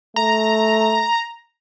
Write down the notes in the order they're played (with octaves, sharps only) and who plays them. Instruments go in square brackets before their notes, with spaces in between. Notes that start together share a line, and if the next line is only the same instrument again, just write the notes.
[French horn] A3 [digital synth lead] A#5